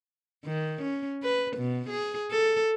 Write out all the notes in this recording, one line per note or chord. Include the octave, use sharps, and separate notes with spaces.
D#3
C#4
B4
B2
G#4
A4